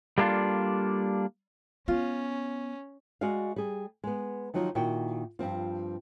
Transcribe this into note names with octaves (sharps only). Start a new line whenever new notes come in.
G3 A#3 D4 D#4 F4 A4
B3 C#4 F4
G#3 F#4 D5 D#5 F5
G3 G#4
G#3 B3
D#3 F3 F#3 D#4 F4
A#2 D#3 E4 F#4 G5
G2 F3 C4 F4